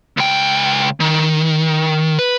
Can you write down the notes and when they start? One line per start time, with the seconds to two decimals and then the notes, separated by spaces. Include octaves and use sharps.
0.17 C#2 G5
1.00 D#3
2.19 B4